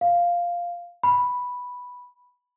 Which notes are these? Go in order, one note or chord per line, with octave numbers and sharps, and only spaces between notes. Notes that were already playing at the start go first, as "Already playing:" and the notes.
F5
B5